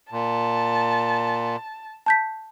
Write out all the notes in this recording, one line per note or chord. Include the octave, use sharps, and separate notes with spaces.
A#2 A5
A5 G6 B6